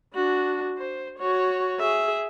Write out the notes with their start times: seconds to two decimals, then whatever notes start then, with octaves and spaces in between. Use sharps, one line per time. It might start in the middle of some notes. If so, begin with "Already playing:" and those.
0.14 D4 F#4
0.78 C5
1.19 F#4 C#5
1.79 G#4 E5